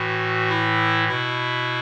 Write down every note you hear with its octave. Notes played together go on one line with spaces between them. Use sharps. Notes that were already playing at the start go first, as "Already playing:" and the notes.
Already playing: A2 E3 F#4
E4
B2 E4